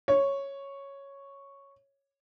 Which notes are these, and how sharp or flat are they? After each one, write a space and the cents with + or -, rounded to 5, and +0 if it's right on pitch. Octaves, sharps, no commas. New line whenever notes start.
C#5 -5